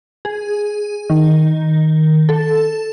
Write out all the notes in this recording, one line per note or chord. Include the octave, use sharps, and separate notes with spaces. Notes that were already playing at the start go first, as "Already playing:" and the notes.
G#4
D#3
A4